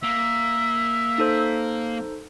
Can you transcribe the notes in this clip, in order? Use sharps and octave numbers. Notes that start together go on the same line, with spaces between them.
A#3 E5
D#4 A4 C5